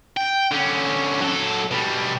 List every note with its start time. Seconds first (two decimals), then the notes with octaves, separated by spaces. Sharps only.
0.17 G5
0.52 D3 C#4
1.21 F#3 A4
1.71 B2 G3